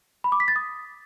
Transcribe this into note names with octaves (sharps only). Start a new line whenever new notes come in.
B5
D6
B6
A6
D#6